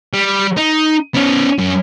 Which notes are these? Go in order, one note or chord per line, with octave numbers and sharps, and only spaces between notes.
G3
D#4
B3 C#4
F#2